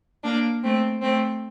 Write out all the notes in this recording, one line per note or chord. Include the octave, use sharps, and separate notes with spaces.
A#3 D4
A3 C4
A3 C4